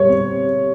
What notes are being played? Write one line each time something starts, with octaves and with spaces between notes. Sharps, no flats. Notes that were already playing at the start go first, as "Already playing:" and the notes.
Already playing: G3 C#5
C4